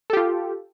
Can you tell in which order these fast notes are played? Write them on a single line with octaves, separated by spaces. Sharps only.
A4 G4 F4